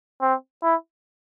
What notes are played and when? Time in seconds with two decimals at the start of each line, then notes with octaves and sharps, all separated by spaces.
0.22 C4
0.63 E4